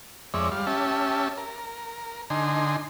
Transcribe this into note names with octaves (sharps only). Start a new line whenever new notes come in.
F2 G#3 C#5 D5 E5
G3 F5
C#4 G4 E5 A5
A#4
D3 D#4 G#5 C6